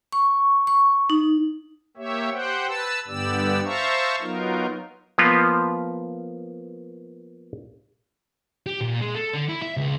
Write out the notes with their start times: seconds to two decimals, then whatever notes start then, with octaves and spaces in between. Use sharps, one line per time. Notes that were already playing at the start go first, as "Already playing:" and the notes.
0.12 C#6
0.67 C#6
1.10 D#4
1.97 A#3 G4 C#5 E5
2.32 G4 C5 F#5 G5
2.67 B4 A5 E6
3.08 G2 D3 B3 G4 D5 E6
3.65 C5 E5 F5 A5 A#5 C#6
4.21 F#3 B3 D#4 F4 A#4
5.18 F3 A#3 B3 F4
8.66 G4
8.81 A#2
9.01 G#3
9.15 A4
9.34 D3
9.49 E4
9.62 E5
9.77 C#2